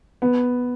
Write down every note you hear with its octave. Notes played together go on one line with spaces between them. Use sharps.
B3